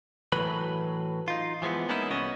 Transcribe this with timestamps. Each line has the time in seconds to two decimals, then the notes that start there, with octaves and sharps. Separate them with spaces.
0.32 A2 E3 F#3 B4 B5
1.28 D#4 F4
1.62 E3 F3 G#3 B3
1.89 G#3 A#3 B3 C#4 D#4 E4
2.10 C2 B3 C#4 D#5